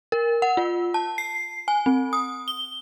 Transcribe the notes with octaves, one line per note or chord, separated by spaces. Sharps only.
A#4
F#5
F4
A5
C7
G#5
C4
D#6
G7